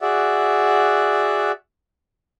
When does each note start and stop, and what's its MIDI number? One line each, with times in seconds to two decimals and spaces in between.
0.01 1.52 66
0.01 1.52 68
0.01 1.52 74
0.01 1.52 76
0.01 1.52 78